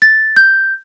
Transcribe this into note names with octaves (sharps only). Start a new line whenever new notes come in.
A6
G6